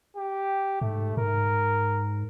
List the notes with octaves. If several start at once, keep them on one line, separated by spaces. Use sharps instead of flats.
G4
G#2 A3
G#2 A#4